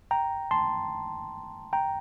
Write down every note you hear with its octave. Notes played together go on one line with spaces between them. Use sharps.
G5 A#5
A5 C6
G5 A#5